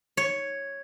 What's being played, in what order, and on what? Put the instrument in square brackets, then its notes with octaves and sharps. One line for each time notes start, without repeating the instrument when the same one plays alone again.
[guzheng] C#5